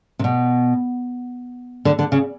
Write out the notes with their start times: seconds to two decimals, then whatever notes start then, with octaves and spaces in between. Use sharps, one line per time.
0.19 C3
0.24 B2
1.85 D3
1.99 D3
2.12 C#3